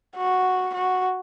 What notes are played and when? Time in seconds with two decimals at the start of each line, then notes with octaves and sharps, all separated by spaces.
0.17 F#4
0.74 F#4